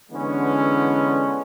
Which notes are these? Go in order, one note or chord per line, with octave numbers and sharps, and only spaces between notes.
D3 E3 G#3 B3 C#4